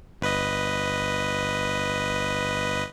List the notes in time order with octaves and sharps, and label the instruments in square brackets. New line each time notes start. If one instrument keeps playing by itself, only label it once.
[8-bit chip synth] G1 B4 D#5